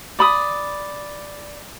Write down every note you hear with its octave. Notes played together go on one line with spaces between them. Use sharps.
D5 B5 D#6